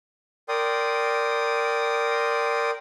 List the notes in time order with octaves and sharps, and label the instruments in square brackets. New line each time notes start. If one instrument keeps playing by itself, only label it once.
[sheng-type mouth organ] A#4 D5 G5 C6 D#6